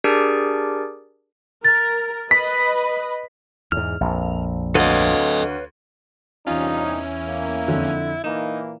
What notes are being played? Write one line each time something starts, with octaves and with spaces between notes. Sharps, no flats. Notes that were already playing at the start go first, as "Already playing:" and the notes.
D4 G4 G#4 A#4 D5
A#4 A6
B4 D#5 B5 B6
E2 G#2 F6
A#1 F2
D2 A4 B4 C#5 D#5 F5
E2 G2 C3 C#4 D#4 F4
E4
A#3
F2 D3
A#2 E3 A#3 D#4 E7